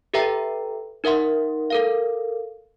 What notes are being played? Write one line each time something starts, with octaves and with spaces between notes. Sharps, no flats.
G4 A4 B4 E5 G5 A#5
D#4 A#4 E5 F#5 C6
A4 A#4 F5